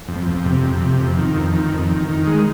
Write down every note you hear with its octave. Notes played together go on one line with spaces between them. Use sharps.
F2
F2
C3
F2
C3
F2
D#3
F2
D#3
F2
D#3
D#3
G#3